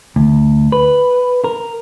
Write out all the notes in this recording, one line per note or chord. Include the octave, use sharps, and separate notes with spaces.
D2
B4
A#4